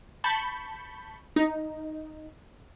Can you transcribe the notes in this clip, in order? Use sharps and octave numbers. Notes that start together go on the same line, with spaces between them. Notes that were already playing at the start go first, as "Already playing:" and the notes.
A5 B5 C#6 G6
D#4